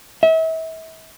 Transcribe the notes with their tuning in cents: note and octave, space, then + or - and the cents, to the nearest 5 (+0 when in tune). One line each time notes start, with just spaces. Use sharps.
E5 -35